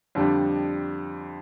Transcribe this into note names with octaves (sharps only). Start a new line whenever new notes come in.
F2 D3 G3 D4